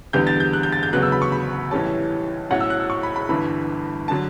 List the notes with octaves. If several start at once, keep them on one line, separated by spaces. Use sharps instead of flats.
E2 D3 G3 B3 G6
A6
G6
F#6
G6
A6
G6
E1 D2 C#3 F#3 B3 F#6
E6
B5
C#6
B5
B1 A2 E3 G3 C#4 A5
B1 A2 F#3 C#4 F#5
E6
F#6
E6
C#6
B5
B5
G1 G2 E3 B5
D3 F#3 A5